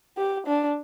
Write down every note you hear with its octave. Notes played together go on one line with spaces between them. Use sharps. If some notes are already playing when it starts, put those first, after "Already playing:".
G4
D4